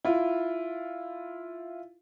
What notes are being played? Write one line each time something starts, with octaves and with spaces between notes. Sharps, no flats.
E4 F4